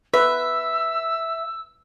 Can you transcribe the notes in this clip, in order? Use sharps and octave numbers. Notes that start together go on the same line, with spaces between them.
B4 E5 E6